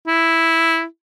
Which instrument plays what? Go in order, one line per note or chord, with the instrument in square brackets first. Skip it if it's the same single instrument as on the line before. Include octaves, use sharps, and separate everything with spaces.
[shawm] E4